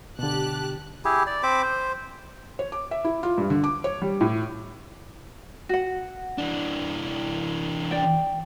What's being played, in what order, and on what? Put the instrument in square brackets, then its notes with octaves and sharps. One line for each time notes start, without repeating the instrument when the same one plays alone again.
[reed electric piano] B2 D3 [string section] G4 A5 F#6
[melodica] E4 G4 G#4
D5
C4 C5 B5 D6
C5
[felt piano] C#5
D6
E5
E4
F4
G2
D3
D6
C#5
G3
A2
[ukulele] F#4 F#5
[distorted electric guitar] E3 D4
[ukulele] D5 G5